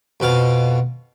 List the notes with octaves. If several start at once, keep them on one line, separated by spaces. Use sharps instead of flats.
F2 B2 F5